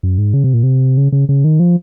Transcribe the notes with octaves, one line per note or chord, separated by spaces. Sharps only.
F#2
G#2
C#3
C3
A#2
C3
C#3
C#3
C#3
D#3
F3